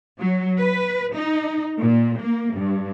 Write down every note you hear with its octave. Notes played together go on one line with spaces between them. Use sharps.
F#3
B4
D#4
A#2
A#3
G2